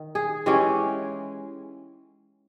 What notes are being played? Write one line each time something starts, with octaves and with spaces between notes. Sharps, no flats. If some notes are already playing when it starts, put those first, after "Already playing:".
Already playing: D#3
G#4
E3 G#3 C#4 G4